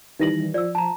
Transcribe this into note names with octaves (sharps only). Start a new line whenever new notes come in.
D#3 E3 G3 D#4 A#6 F#7
F3 D5 E6
A5 A#5